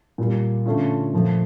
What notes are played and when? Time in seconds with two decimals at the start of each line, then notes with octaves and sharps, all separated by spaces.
0.18 A#2 G3 A#3
0.66 D3 A3 C#4 F4
1.13 A#2 F3 A3